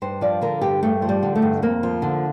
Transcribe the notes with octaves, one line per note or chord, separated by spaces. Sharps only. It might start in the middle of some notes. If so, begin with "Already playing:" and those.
G2 C5
F3 D5
D3 A#4
G2 G4
G2 A3
F3
G3
D3
A3
G2
F2 A#3
F3
D3